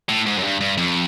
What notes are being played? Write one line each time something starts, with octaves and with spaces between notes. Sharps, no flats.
A2
G#2
F#2
G2
G2
F2